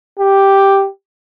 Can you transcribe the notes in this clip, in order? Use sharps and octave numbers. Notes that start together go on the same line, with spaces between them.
G4